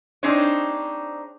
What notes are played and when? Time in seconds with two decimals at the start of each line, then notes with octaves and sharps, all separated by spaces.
0.23 C4 D4 D#4 G#4 C5 C#5